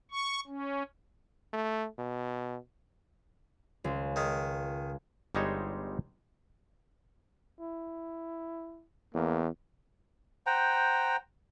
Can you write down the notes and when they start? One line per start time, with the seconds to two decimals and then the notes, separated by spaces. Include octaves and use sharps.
0.11 C#6
0.47 C#4
1.53 A3
1.98 B2
3.84 C#2
4.16 D#3 G#3
5.35 G1 G3 G#3 D#4 C5 C#5
7.61 E4
9.14 E2 A#3
10.46 C5 F#5 G5 A#5